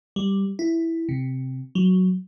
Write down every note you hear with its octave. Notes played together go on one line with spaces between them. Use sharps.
G3
E4
C3
F#3